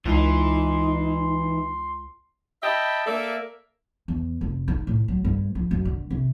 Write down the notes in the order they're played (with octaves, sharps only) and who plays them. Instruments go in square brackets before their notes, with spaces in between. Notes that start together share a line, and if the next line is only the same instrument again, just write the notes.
[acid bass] C#2 [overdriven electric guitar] E3 [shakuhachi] D#4 [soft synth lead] C6
[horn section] D#5 E5 G5 A5 B5
A#3 A4 D5 E5
[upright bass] E2
F1
D#4
A2
F#3
G2
F3
F#2
D3
C3